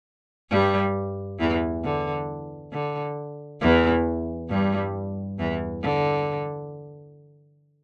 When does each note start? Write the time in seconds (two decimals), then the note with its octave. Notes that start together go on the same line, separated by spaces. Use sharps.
0.51 G2 G3
1.40 E2 E3
1.84 D3
2.73 D3
3.61 E2 E3
4.50 G2 G3
5.39 E2 E3
5.83 D3